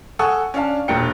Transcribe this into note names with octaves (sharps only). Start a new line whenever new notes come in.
A4 F#5 G#5 C#6 D#6 E6
C#4 D4 F5 A5
E1 G2 A#2 A#4 G5 C#7